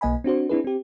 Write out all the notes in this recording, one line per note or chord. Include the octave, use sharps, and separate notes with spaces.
B1 A#3 D#5 G#5 B5
C4 D4 F#4 C5
C4 D4 E4 G#4 B4
C4 G4